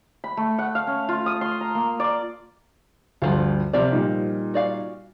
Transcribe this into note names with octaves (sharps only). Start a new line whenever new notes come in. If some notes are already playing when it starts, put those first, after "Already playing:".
B5
A3
F#5
F5
C#4
F4
D#6
C6
A#5
A#3
D5
D2 G2 F3 F4
C3 F3 D5
A#2 G3 D#4
F#4 D5 F5